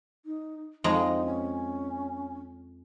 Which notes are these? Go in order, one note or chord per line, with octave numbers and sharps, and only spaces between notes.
D#4
F2 G#3 D#4 A#5
C#4